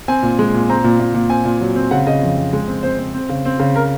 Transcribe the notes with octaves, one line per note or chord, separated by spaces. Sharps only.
C4 G#5
A#2
G#3
A#2
C4 A#5
A#2
A#2
A#2
C4 G#5
A#2
F#3
C4
C#3 F#5
C#3 D#5
F2
F2
G#3
C4
C4 C5
C4
C4
C#3
C4
C#3
A#4